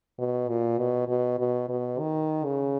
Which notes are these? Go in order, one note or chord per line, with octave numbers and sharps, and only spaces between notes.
B2
A#2
B2
B2
B2
B2
D#3
C#3